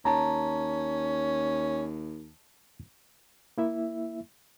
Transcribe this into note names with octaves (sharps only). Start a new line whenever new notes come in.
D#2 C#4 A5 A#5
A#3 E4 E5